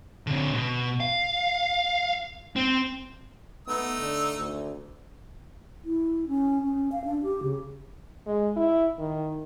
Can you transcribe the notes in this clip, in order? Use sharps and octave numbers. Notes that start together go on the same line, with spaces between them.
D3 C4
B2
F5
C4
A3 B3 D#4 E6
D3
D2
E4
C#4
C#4
F5
D4
G4
C#3
G#3
E4
D#3